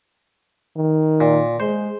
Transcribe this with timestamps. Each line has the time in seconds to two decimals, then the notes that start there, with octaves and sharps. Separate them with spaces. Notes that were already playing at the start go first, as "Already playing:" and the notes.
0.77 D#3
1.21 A#2
1.60 G#3 C5